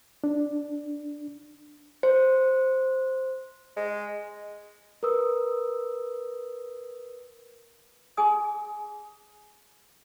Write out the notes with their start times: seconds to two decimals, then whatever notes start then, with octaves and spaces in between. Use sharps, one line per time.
0.24 D4
2.03 C5
3.76 G#3
5.03 A#4 B4 D#6 E6
8.17 G#4 G#5 D#6